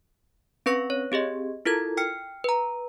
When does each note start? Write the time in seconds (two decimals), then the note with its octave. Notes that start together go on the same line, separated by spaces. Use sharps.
0.66 C4 C#4 B4 C#6 A#6
0.90 C#5
1.12 C4 G4 G#4 D#5
1.65 E4 F4 A4 A#4 G#6
1.97 G5 F6 C#7
2.44 B4 A#5